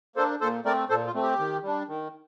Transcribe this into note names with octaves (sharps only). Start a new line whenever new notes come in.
A#3 D4 A4 C5
A#2 A4 C5
A3 C4 A#4 D5
A#2 A4 C5
F4
A3 C4
G4
D#3
G3 D4
D#3